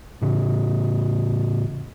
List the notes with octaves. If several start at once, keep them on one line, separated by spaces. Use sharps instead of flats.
A2 C#3